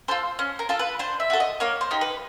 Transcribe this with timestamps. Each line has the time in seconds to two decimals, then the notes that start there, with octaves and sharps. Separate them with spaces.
0.08 F4 A4 C5
0.39 C#4
0.59 A#4
0.69 F4 A4
0.79 B4
0.99 D4 C5
1.20 E5
1.30 F#4 A4
1.40 D#5
1.60 A#3 C#5
1.81 C5
1.91 D#4 G4
2.01 B4